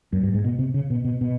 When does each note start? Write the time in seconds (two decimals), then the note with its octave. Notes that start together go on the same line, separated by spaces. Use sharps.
0.13 F#2
0.23 G2
0.34 G#2
0.44 B2
0.59 C3
0.74 C#3
0.90 B2
1.05 B2
1.21 B2